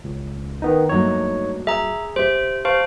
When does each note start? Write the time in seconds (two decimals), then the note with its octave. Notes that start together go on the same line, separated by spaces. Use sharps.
0.04 C#2
0.62 D#3 B3 D#4
0.89 G2 F#3 A3 A#3 D#4 C#5
1.67 G#4 E5 A#5
2.16 G4 C5 E5
2.65 C5 F5 A5 C#6